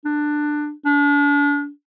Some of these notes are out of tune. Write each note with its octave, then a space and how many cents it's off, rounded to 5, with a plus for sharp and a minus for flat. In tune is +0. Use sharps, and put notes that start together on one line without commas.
D4 +15
D4 -35